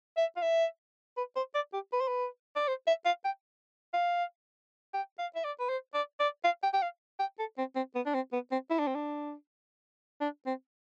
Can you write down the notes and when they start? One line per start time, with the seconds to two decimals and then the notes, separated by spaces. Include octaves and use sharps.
0.17 E5
0.37 F5
0.42 E5
1.17 B4
1.36 C5
1.55 D5
1.73 G4
1.93 B4
2.01 C5
2.08 B4
2.56 D5
2.68 C5
2.87 E5
3.05 F5
3.25 G5
3.94 F5
4.94 G5
5.19 F5
5.36 E5
5.44 D5
5.60 B4
5.69 C5
5.94 D5
6.20 D5
6.45 F5
6.63 G5
6.74 G5
6.82 F5
7.20 G5
7.39 A4
7.58 C4
7.76 C4
7.95 B3
8.06 D4
8.14 C4
8.33 B3
8.52 C4
8.70 E4
8.79 D4
8.87 C4
8.95 D4
10.21 D4
10.46 C4